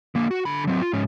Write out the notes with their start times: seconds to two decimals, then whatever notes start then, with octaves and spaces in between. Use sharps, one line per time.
0.15 D3 A#3
0.31 F#4
0.45 D3 B5
0.67 F#3 C4
0.81 F4
0.93 G#2 C#4